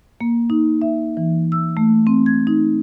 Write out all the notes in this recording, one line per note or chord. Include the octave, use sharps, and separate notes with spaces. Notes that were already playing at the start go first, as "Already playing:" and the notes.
A#3
D#4
E5
E3
E6
A3
C4
G#6
D#4